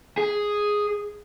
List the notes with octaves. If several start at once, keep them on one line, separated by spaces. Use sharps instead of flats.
G#4